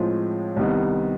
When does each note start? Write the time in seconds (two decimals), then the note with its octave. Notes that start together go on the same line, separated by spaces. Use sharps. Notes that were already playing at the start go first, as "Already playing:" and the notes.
Already playing: A2 F3 G#3 C4 F4
0.56 C2 C3 D#3 G3 B3